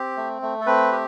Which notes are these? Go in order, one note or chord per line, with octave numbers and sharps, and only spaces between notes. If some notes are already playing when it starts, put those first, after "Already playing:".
Already playing: C4 G4
A3
A3
A4
C4 B4
G4